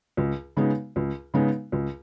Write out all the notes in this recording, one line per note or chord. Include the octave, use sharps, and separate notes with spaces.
C#2
C#3 G#3 B3 D#4
C#2
C#3 G#3 B3 D#4
C#2